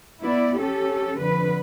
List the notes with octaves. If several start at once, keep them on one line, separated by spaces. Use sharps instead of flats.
B3 E4 D5
C#4 G4 A4
F2 D3 B4